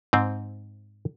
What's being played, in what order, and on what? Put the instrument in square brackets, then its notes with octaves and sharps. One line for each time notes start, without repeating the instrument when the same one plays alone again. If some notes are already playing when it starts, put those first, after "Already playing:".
[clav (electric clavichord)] G#2 C4